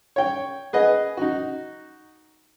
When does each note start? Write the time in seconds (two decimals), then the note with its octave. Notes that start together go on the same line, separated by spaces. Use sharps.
0.16 C#5 G5
0.73 G#4 B4 D#5 F#5
1.17 D#4 F#4